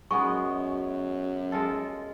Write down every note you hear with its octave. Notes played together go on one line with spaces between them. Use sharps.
F#2 G#3 B3 G#4 C#6
G#3 F4 A4